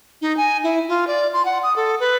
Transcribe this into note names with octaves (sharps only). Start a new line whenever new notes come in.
D#4
G#5
E4
F4
D5
C6
F#5
D#6
A4
B4